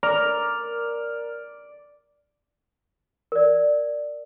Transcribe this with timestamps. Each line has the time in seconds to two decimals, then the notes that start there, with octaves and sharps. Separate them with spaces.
0.03 A#4 D5 F6
3.32 A#4 D5